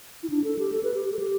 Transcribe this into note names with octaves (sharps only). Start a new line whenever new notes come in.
E4
D4
A4
G4
A4
B4
G4
G4
A4
G4